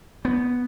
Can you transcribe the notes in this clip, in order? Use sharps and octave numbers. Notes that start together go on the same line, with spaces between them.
B3